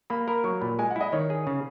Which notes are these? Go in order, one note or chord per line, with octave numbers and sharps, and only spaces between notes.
A#3 B5
A#4 B5
F#3 C#6
A#2 B5
G#3 G#5
F#5
E4 D#5
D#3 C#5
G#4
C#3